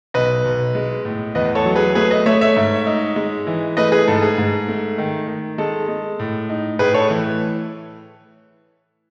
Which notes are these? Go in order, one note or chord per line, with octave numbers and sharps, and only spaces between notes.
B1 B4 D#5
B1
G#3
A2
E2 B4 D#5
A4 C#5
F#3
G#4 B4
A3 G#4 B4
B4 D#5
A3 C#5 E5
C#5 E5
G#2
D#4
G#3
E3
A3 B4 D#5
G#4 B4
G#2 A4
G#4
G#2
A3
D#3
D#3
G#3 A4
G#3
A2
D#4
A2 G#4 B4
A4 C#5
E3